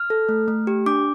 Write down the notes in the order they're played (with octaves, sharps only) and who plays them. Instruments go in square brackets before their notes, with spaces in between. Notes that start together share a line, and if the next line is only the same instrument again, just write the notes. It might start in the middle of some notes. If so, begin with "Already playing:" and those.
Already playing: [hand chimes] F6
A4
A3
A3
G4
D4 D6